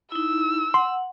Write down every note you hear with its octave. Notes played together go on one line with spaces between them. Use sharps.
D#4 E4 E6
F#5 C6